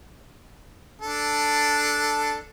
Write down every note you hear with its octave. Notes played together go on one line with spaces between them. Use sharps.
D4 A4